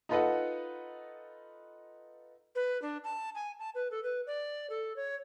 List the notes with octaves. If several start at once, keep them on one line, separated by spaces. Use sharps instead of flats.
D#4 F4 A4 B4 D#5 F#5
B4
D4
A5
G#5
A5
B4
A4
B4
D5
A4
C#5